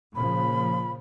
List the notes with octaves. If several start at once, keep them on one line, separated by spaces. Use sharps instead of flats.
A#2 C#3 F3 B5